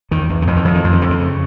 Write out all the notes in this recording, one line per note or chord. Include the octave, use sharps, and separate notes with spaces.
E2 D#3
E2
D#3
F2 E3
D#3
F2 E3
D#3
F2
D#3
F2 D3
D#3
C#3